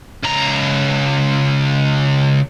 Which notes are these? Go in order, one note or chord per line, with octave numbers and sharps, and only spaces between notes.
C#2 A#5